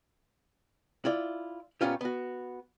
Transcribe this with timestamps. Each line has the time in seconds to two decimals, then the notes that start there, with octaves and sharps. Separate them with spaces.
1.05 E4 F4 D5
1.81 A#2 D#3 B3 C#4 F4 G4
2.01 B3 F#4